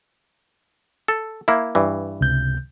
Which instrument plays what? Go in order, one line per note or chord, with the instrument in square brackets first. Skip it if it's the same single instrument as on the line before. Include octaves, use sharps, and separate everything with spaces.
[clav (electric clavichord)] A4
A#3 E4
G2 E3
[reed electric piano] C#2 C3 G6